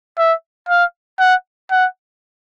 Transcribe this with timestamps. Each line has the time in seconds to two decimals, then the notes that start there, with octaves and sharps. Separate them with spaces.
0.18 E5
0.69 F5
1.19 F#5
1.71 F#5